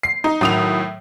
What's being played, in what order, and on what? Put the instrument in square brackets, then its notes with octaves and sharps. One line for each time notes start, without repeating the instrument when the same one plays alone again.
[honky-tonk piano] C7
[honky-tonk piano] D#4 [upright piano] D#5
[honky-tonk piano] A2 D#6 F7 [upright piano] D#3 F#3